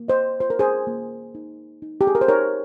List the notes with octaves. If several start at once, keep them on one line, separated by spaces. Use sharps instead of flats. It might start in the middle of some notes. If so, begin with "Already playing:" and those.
Already playing: A#3
C5 D#5
F4 C5
A#4
G#4 C5
A#3
D#4
D#4
G4
G#4
A#4
C5
D#4 A#4 C#5